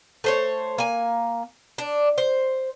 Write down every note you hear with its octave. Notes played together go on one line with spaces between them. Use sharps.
A3 C5 C#5
A#3 G#5
D4
C5